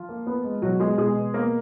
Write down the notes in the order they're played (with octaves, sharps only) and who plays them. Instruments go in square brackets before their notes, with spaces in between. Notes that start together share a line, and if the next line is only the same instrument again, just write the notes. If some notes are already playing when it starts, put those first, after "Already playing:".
Already playing: [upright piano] F3 F4
A#3
B3
G#3
B2 F#3 F#4
G#3 B3 G#4
B2 G#3 G#4
B2
A#3 B3 A#4